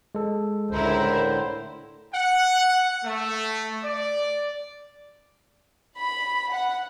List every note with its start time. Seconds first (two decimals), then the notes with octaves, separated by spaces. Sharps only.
0.15 G#3 A4
0.71 C#2 A2 D3 E4 A#4 C5
2.14 F#5
3.05 A3
3.84 D5
5.98 B5
6.52 F#5